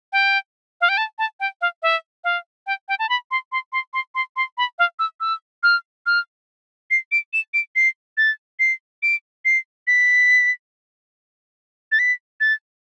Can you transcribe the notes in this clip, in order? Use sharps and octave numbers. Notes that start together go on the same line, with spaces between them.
G5
F5
G5
A5
A5
G5
F5
E5
F5
G5
G5
A5
B5
C6
C6
C6
C6
C6
C6
B5
F5
E6
E6
F6
F6
C7
D7
E7
D7
C7
A6
C7
D7
C7
B6
A6
B6
A6